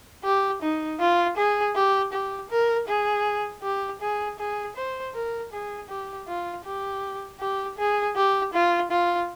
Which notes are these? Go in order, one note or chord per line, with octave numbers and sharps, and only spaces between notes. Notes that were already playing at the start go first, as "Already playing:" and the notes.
G4
D#4
F4
G#4
G4
G4
A#4
G#4
G4
G#4
G#4
C5
A#4
G#4
G4
F4
G4
G4
G#4
G4
F4
F4